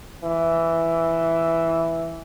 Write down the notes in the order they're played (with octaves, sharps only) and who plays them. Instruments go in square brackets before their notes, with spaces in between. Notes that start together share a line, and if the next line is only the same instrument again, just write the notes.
[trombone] E3